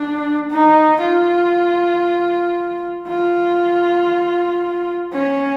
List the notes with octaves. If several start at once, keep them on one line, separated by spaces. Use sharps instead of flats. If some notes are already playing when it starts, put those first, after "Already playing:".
Already playing: D4
D#4
F4
F4
C#4